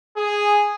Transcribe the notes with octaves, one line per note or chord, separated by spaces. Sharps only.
G#4